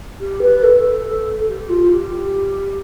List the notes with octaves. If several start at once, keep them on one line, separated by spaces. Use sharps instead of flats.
G4
B4
A4
G4
F4
G4